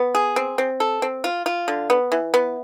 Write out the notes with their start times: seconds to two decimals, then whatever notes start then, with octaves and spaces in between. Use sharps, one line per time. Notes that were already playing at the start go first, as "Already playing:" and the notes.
Already playing: B3
0.15 G#4
0.36 C4
0.58 C4
0.80 A4
1.02 C4
1.24 F4
1.46 F4
1.68 D3
1.90 B3
2.12 E3
2.34 B3